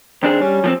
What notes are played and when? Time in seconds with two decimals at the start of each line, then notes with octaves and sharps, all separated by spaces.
0.23 D#2 C4 D4 G#4
0.41 G3 C#4
0.64 F3 A3 C4